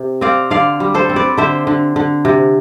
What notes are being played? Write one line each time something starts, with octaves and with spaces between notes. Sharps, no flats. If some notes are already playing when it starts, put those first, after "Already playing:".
Already playing: C3
C4 D5 F5
D3 D5 F5
G3
A4 C5
C4
B4 D5
D3 C5 E5
D3
D3
C3